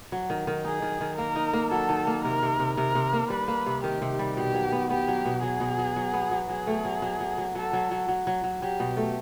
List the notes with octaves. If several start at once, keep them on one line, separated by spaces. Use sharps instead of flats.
F#3
D#3
D#3
D#4 G#4
D#3
D#3
A#3 A#4
D#4
A#3
F#3 A4
D#3
A#3
C3 A#4
C3
C3
C3 A#4
C3
A#3
G3 B4
A#3
C3
D#3 G4
C3
G3
B2 G4
F#3
B3
B3 G4
F#3
B2
F#3 G#4
B2
F#3
F#3
B3
F#3
F#3 G#4
A3
F#3
F#3
F#3
F#3
F#3 A4
F#3
F#3
F#3
F#3
F#3
F#3 G4
B2
A3